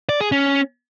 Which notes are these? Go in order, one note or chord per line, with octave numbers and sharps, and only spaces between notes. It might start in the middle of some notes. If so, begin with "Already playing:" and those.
D5
G#4
C#4